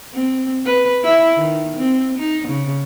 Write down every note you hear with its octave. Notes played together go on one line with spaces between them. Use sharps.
C4
B4
E4
D#3
C4
D#4
C#3